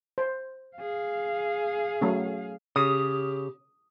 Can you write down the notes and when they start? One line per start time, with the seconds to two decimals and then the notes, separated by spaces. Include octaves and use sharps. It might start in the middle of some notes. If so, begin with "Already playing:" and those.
0.18 C5
0.77 G#4 F5
2.01 F#3 A3 C#4
2.76 C#3 G4 D#6